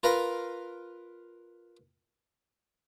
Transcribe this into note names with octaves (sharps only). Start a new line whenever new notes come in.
F4 A#4 B4 F5 A#5